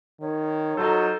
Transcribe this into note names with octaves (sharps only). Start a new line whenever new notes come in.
D#3 C#5
F#3 D#4 F4 A4 C5 A#5